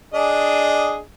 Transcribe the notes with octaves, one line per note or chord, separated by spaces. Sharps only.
D4 G#4 D#5